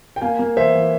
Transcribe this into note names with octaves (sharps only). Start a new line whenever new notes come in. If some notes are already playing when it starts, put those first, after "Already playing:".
G5
A#3 F5 G#5
A#3
E3 C5 E5
E3